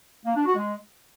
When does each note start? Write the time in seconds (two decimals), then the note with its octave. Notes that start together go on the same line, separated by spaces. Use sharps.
0.25 A#3
0.35 D4
0.45 F#4
0.55 G#3